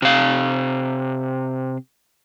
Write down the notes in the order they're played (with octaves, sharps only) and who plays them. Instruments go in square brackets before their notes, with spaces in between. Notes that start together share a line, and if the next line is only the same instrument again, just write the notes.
[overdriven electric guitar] C3 F5